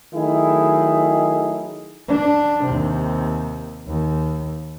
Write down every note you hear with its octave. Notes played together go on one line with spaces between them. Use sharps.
D#3 F#3 A3 D#4 E4 G#4
D4
D#2 C3
D#2